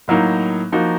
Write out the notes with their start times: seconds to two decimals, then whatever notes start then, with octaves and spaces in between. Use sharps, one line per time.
0.08 A2 F#3 A#3 D#4
0.72 F3 A#3 D#4 F#4